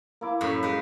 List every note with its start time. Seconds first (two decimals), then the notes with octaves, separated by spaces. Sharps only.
0.21 A#3 E4 D6
0.41 F#2 A2 B5
0.63 G#3 D#4 B4